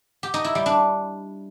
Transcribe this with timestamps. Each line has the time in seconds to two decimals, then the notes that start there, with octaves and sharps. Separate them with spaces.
0.23 G4
0.34 D#4
0.44 E4
0.55 G3
0.66 D4